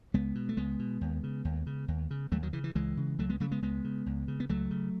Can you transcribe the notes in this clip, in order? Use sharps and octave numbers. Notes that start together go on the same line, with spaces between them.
C#2 G#3 B3
B2
A3
C#2 G#3 B3
B2
D#2
C#3
D#2
C#3
D#2
C#3
D#2 F#3 A3
D#3 F#3
C#3 E3
E3
C#2 E3 G#3
C#3
C#2 F#3 A3
G#3 B3
C#3 F#3 A3
G#3 B3
C#2 G#3 B3
C#3
C#2
C#3
B3
C#2 F#3 A3
C#3